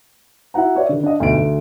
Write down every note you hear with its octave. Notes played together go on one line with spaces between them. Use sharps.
E4 F#4 F#5 A#5
B4 C#5 D5 E5
D3 D#3
D4 D#5
D2 B2 D#4 D7
D2